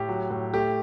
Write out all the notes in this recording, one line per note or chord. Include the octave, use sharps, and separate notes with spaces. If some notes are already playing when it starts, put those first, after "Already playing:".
Already playing: A2 G4
F#3
A2
A3 G4